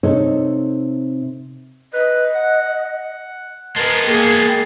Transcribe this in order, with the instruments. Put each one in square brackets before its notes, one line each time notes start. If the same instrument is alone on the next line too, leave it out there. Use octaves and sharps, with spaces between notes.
[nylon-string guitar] C3 D#4 A4 C#5
[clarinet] B4 [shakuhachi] D#5
[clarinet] F#5
F#5
[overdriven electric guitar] G#3 B3 [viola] A#4 [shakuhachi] B4 [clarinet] A5
[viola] A#3 G#4 [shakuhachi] G5